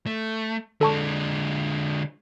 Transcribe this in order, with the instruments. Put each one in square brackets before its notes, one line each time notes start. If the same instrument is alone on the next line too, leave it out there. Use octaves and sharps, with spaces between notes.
[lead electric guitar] A3
[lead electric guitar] D3 G#3 [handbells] A4 A5 C#6